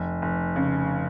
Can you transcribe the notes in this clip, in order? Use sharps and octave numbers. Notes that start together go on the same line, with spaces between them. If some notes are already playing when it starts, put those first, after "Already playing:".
Already playing: F1
F1
C#3